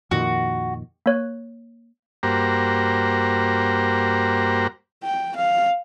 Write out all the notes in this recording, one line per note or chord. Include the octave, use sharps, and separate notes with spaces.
F2 A#2 D#3 F#4
A#3 C#5 F#6
G2 A#3 F#4 G4 C5 A#5
G5
F5